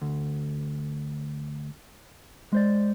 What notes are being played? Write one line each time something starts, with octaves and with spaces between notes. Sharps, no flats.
D2
G#3 C5 D5